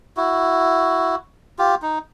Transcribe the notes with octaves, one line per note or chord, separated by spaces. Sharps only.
E4 F#4
F4 G4
D#4